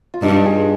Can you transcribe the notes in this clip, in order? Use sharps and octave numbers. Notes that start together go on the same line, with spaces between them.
F4
G2 D#4
G#4